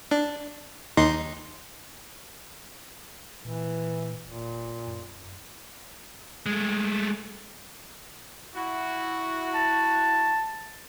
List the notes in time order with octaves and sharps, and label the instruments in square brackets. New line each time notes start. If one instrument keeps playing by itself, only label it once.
[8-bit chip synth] D4
D#2 D#4 C6
[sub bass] A#2 [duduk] E3
[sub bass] E1 [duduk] A#2
[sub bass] F#2
[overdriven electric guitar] G#3 A3
[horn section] E4 F#4
[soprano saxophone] A5